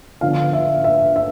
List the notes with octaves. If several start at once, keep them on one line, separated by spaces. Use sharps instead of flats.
D3 F3 B3 D4 F5
E5
E5
E5